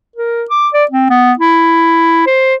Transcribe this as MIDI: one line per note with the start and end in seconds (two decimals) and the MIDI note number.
0.16 0.44 70
0.50 0.68 86
0.74 0.84 74
0.91 1.08 60
1.10 1.33 59
1.39 2.22 64
2.27 2.55 72